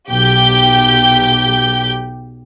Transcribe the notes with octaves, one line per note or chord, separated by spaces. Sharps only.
B1 G4 G6